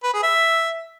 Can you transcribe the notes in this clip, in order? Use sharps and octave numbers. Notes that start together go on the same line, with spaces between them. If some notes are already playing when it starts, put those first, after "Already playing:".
B4
G#4
E5